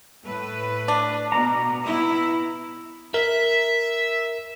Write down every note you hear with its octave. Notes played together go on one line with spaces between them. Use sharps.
A2 A3 B4
D4
B2 A#5
B3 E4
A#4 E5